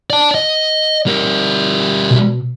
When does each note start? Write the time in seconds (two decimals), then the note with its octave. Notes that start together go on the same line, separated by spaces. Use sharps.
0.10 D5 A5
0.35 D#5
1.07 G3 A#4
2.11 B2